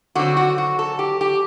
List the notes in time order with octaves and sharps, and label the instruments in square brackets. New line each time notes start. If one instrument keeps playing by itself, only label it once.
[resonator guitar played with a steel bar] D3 F#3 C4 F#4
F#4
F#4
A4
G4
G4